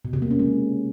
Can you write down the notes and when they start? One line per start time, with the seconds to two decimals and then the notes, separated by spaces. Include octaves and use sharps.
0.05 B2
0.13 C3
0.22 A#3
0.31 C#4
0.39 G#3